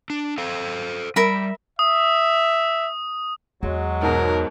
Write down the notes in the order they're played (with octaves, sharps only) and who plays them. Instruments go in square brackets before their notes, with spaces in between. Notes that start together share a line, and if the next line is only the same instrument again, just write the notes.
[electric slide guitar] D4
A4 C5 F5
[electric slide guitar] G3 [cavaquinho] A#4 E5 B5
[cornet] E5 [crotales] D#6
[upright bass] E2 [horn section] F#3 G#3
[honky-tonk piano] G#2 B2 G#4 [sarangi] A#4